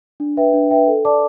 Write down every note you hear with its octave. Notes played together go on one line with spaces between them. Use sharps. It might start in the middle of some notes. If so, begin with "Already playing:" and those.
D4
B4 E5 G5
D4
B4 E5 G5
A4
D5 A5 D6